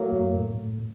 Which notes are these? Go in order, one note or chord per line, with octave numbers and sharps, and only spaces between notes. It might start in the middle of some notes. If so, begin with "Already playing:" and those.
Already playing: A2 F#3 A#3
F#2
A2
A2